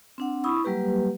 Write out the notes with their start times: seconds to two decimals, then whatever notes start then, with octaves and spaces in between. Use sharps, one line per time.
0.18 C4 D4 F#5
0.44 E4 B5 C#6 D#6 E6
0.64 F#3 G3 A#3 G4 B4